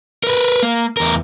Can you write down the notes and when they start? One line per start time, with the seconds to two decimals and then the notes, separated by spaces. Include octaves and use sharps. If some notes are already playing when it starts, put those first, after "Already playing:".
0.23 A#4 B4
0.63 A#3
0.97 E2 A#4